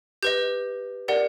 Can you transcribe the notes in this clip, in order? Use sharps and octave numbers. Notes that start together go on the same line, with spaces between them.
G4 B4 D#5 G6
G4 A#4 D5 F#5